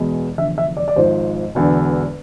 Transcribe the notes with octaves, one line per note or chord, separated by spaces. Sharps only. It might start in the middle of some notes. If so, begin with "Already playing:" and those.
Already playing: E2 B2 G#3
F1 E2 D3 E5
E5
D5
D5
G#1 G#2 F3 C5
E1 E2 D3